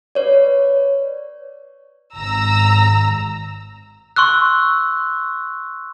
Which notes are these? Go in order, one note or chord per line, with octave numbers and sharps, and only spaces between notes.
B4 C#5 D5
G#1 A#5 E6
C6 C#6 E6 F#6